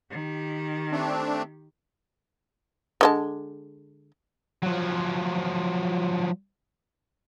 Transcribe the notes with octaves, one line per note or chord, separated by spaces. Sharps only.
D#3 G4
A3 C4 D4
D3 G#3 A5
F3 F#3